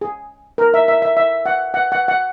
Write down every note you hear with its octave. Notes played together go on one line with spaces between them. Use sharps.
G#4
A#4
E5
E5
E5
E5
F#5
F#5
F#5
F#5